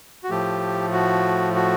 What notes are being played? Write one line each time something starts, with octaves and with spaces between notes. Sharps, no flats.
F#4
A2 F3 A3 G4
F#4
F#4